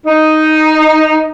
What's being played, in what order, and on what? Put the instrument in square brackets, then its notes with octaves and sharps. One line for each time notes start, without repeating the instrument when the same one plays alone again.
[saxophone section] D#4